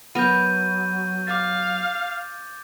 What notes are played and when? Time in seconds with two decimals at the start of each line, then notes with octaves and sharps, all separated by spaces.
0.15 F#3 B3 A#4 G6 D#7
1.27 F5 D6 A6